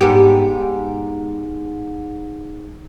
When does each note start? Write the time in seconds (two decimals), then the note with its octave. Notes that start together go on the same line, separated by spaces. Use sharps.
0.01 G#2 B3 G4